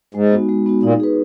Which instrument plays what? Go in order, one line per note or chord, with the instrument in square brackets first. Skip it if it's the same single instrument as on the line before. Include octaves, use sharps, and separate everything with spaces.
[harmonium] G#2 [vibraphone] G#3
[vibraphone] B3 D#4 F#4
G#3
B3 D#4 F#4
[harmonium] A#2 [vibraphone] D#4
[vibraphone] G#4 B4